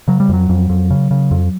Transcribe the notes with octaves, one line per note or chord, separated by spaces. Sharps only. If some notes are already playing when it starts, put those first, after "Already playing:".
C#3 F#3
G3
F2 F#3
F2
F2
C#3
C#3
F2